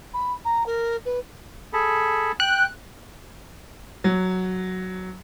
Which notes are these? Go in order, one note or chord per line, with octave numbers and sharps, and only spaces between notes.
B5
A#5
A#4
B4
G#4 A4 B5
G5 F#6
F#3